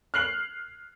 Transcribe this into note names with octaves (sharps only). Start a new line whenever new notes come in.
F6 F#6 C7 F#7